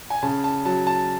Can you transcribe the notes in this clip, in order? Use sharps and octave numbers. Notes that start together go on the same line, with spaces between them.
G#5
C#3 A5
A5
F#3 A5
A5